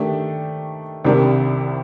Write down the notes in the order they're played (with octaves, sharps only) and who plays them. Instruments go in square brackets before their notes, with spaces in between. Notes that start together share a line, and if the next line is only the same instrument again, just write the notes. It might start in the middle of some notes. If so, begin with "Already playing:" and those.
Already playing: [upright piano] D#3 A3 D4 G4
C2 C3 D#3 G3 D4